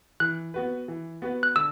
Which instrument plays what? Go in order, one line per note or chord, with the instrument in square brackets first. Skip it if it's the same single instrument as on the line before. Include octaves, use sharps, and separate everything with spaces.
[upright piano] E3 [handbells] F#6
[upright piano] B3 F#4 B4
E3
B3 F#4 B4
[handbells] F#6
[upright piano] D3 [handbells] E6